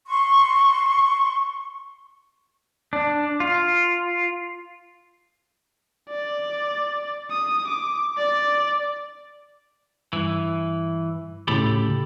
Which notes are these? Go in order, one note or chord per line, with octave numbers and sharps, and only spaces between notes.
C6 C#6
D4
F4
D5
D#6
D6
D5
G2 E3
D2 A2 C#3 G4 A4 B5